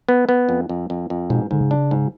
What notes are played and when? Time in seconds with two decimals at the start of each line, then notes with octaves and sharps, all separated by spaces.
0.09 B3
0.29 B3
0.49 F2
0.69 F2
0.90 F2
1.10 F2
1.30 G#2 B2
1.51 G#2 D3
1.61 C#3
1.71 D4
1.91 G#2